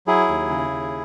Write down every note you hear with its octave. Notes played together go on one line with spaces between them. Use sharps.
F#3 E4 G#4
D#2
C#3
D#2